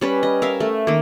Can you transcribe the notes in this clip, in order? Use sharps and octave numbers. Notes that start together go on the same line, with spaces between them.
G3 C#4 B4
D#5
A#4 E5 F5
A3
D#3 A#3